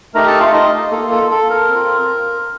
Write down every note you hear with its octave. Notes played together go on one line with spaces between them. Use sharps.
A3 D#4 G4 A#4 A#5
A4 A5
F4 F5
D#4 D#5
A#3 F4 A4
A4
A4
A#4
C4 F4